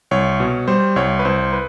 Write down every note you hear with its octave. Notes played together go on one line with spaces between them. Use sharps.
C2 C#5
B2
G3 C5
C2 C#5
B4
C2 C5
B4